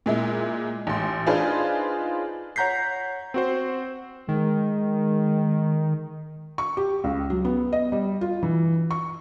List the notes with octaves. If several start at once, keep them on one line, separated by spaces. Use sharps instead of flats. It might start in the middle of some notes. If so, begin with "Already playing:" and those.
A#2 G#3 E4
A1 C6
D4 D#4 F4 G#4 B4 C5
C#5 F#5 A#5 G6 B6 C7
C4 F#4 C5
D#3 G#3
C#6
G4
C#2
F#3
B3
D#5
G3
F4
E3
C#6